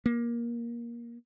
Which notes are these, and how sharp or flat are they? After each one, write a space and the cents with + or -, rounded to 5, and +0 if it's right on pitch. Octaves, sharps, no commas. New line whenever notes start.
A#3 +20